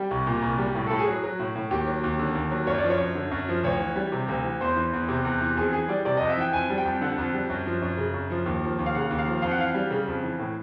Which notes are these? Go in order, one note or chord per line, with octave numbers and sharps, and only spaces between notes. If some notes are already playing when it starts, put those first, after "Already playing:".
Already playing: G3 G4
C2
A#2
C2
G3
A2
A2 A4
G#4
F#3
F#3
A2
A2
D#2 G4
F#3
D#2
D3
D#2
F#3
F#2 C#5
D5
F3
C#5
F#2
D3
F#2
F3
D2 C#5
E3
G3
C3
D2
E3
E2 C5
E3
E2
C3
E2
E3
F2 G#4
E3 G#4
G3 D5
C3 D5
F2 D#5
E5
E3 G5
F2 G#5
G3
G5
F2
D3 F#5
F2
G3
F#2
F3
F#2
C#3
F#2
F3
D#2
F3
D#2
F5
C#3 F#5
D#2
F5
F3
F2 F5
F#5
E3 F5
G3
C#3
F2
E3
A2